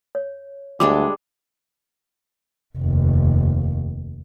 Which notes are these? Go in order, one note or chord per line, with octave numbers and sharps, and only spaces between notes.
C#5
D2 G3 G#3 D4 D6
F1 D#2